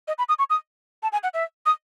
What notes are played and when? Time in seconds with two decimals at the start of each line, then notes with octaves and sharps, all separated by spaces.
0.08 D#5
0.18 B5
0.29 D#6
0.39 C#6
0.50 D#6
1.03 A5
1.12 G#5
1.23 F#5
1.34 E5
1.66 D#6